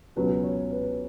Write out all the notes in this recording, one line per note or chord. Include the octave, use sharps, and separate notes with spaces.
C#2 B2 F#3 C#4 B4
C#5
B4